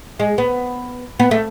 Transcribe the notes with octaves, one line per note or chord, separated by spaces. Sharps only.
G#3
B3
B3
A3